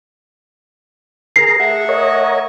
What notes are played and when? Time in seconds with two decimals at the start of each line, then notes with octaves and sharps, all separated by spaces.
1.36 G#4 A#4 A#5 C7
1.60 A3 G#4 E5 F#5
1.89 A#4 C#5 D#5